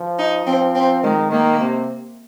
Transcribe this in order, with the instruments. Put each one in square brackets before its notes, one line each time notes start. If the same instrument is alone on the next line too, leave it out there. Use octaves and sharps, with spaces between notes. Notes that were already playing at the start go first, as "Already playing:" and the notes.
Already playing: [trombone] F3
[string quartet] D#4
[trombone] F3 [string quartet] C4
[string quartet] C4
[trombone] D#3 [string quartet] G#3
[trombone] D#3 [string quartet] A#3
[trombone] C3